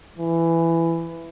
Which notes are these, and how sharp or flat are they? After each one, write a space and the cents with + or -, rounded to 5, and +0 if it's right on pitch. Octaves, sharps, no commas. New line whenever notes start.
E3 +15